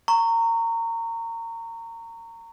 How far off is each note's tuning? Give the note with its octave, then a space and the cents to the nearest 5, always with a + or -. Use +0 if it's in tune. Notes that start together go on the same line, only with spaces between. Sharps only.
A#5 -25 C#6 +0